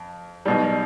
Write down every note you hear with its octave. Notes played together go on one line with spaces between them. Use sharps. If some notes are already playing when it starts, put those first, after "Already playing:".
Already playing: F2
B1 B2 G3